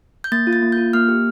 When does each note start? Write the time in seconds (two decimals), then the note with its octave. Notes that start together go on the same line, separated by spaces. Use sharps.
0.24 G6
0.32 A#3 A6
0.47 F4
0.53 A6
0.62 A#3
0.72 G6
0.78 F4
0.93 A#3 F6
1.08 G4